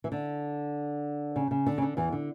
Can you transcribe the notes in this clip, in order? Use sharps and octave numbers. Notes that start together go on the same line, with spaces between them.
E3
D3
C#3
C#3
D3
C#3
D3
E2 E3
D3